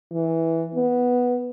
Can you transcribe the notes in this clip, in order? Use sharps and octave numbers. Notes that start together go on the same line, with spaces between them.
E3
B3